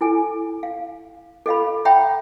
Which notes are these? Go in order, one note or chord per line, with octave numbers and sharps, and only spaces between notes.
E4 A4 G#5
F5
A4 D#5 F5 B5
C#5 E5 F#5 G5 A#5 B5